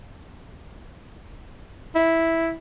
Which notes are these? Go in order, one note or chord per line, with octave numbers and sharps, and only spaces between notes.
E4